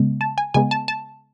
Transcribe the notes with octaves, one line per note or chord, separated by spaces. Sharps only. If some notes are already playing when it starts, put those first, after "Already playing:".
Already playing: C#3 G#3 B3
A5
G#5
C#3 G#3 B3 G#5
A5
A5